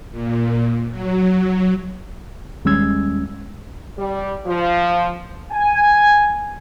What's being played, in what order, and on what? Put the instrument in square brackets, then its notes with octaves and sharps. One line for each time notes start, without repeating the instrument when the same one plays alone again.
[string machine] A#2
F#3
[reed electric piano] D#2 G3 G#3 C#4 E6 G#6
[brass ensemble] G3
F3
G#5